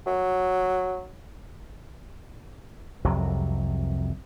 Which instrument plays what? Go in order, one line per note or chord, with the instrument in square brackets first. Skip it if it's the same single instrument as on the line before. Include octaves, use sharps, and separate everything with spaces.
[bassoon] F#3
[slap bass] C2 F2 C3 F#3